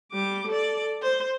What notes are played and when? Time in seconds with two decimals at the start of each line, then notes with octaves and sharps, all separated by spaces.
0.12 G3 D6
0.48 A4 D5
1.02 C5